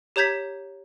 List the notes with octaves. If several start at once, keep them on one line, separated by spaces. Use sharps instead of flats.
G4 C#5 A#5 G6 G#6 B6